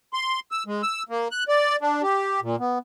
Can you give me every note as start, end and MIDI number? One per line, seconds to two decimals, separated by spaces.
0.13 0.40 84
0.52 0.63 88
0.66 0.82 56
0.83 1.03 88
1.09 1.28 58
1.31 1.44 90
1.48 1.76 74
1.81 2.02 62
2.02 2.40 67
2.42 2.56 46
2.59 2.78 59